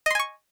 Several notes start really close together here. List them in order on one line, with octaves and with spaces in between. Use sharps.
D#5 C6 G#5 C#6